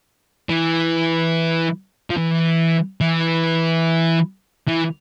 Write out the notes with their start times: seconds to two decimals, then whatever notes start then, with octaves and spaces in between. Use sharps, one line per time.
0.49 E3
2.10 F3
2.17 E3
3.01 E3
4.68 E3